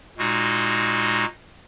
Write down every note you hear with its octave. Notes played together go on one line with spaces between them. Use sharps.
A#2 G#3 D#4 F#4